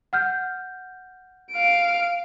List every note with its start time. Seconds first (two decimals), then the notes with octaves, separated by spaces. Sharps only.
0.13 F#5 F6 G6
1.52 F5 D7